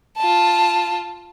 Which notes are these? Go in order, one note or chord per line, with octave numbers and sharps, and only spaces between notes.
F4 A5